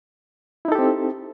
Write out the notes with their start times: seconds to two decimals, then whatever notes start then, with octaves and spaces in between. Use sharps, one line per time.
0.65 E4
0.68 D#4
0.72 A4
0.75 G4
0.79 C4